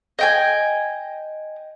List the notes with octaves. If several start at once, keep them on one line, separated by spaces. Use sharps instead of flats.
D#5 G5 G#5